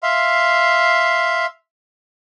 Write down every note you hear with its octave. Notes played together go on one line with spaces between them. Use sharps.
E5 F5 C6